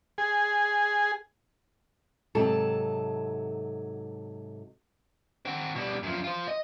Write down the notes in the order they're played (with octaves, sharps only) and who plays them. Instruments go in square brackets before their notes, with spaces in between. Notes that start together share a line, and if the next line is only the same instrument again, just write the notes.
[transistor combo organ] G#4
[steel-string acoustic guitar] G#2 C3 F#3 A4 A5
[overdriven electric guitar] C4 F#4
B2 G3
F#2 F3
F4 C5
D#5